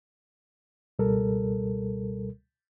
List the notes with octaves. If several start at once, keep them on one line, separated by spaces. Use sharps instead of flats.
C#2 B2 G3 A4 A#4